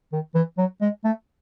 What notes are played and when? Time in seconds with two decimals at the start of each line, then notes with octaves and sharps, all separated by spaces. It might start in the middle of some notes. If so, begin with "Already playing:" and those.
0.12 D#3
0.35 E3
0.58 F#3
0.81 G#3
1.04 A3